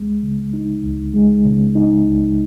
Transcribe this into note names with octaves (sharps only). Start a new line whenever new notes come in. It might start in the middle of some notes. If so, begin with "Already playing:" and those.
Already playing: C#2 G#3
C#3
D#4
C#2
G#3
C#3
D#4
C#2